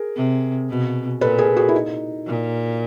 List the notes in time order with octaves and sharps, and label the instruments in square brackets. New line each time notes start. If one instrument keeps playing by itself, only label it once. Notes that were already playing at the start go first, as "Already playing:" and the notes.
Already playing: [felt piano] G#4 A#4
[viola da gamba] C3
B2
[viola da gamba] A#2 [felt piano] A4 B4
[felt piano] G#4 A#4
F#4 G#4
E4
D#4
[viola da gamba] A#2